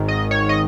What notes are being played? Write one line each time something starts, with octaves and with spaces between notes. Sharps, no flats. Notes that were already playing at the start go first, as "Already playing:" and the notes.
Already playing: G#1 G#2 D#3
D#5
C#5
D#5